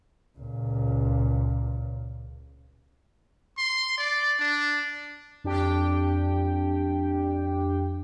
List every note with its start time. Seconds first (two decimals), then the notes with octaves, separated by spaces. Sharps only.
0.38 C#2 A#2
3.58 C6
3.98 D5
4.40 D4
5.44 F2 D4 G4 G5